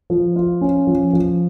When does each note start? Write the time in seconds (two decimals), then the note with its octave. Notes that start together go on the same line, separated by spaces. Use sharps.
0.10 F3
0.36 F4
0.61 C#4
0.87 F3
1.13 F3